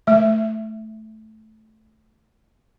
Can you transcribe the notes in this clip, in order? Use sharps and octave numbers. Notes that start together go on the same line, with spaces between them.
A3 E5